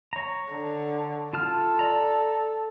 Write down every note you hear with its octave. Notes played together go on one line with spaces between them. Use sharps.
C#5 A#5
D3
F4 A4 A5 F6
D5 A#5